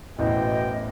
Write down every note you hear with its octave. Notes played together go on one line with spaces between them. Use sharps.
A1 E2 B2 C5 D#5 G5